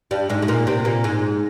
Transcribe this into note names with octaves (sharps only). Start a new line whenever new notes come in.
G2 G3
G#2 G#3
G#3
A#2 A#3
C3 C4
A#2 A#3
G#2 G#3